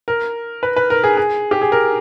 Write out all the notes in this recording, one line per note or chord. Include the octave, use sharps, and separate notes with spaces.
A#4
B4
B4
A#4
G#4
G#4
G4
G#4
A#4